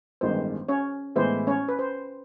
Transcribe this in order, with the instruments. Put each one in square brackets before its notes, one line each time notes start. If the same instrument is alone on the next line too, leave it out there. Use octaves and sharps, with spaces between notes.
[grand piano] A1 G2 D#3 G#3 B3 [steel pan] C5
[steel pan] C#4 C#5
[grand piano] A2 E3 G#3 B3 E4 [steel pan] C5
[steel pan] C#4 C#5
B4
C5